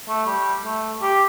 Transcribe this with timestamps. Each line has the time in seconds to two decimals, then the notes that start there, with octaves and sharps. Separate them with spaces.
0.08 A3
0.26 G3
0.65 A3
1.02 G4